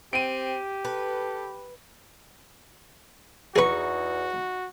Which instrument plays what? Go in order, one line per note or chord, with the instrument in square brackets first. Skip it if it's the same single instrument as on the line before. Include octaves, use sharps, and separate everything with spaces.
[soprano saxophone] C4 [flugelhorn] G4 [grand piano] D7 D#7
[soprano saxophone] A4 [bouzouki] B4
[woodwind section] E2 [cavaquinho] D#4 C#6 [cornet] F#4 [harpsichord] G#4 B4